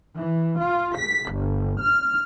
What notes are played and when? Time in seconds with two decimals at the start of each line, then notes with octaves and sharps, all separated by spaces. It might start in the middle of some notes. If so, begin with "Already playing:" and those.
0.18 E3
0.60 F4
0.96 B6
1.33 G1
1.82 F6